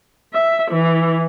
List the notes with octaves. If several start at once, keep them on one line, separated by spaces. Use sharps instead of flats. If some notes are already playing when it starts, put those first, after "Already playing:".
E5
E3